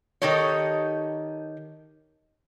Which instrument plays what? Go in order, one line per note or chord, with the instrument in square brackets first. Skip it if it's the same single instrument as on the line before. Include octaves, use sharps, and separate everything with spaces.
[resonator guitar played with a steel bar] D#3 D#4 G4 A4 C#5